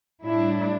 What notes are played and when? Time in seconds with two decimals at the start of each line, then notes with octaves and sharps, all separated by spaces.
0.23 A2 G3 D4 E4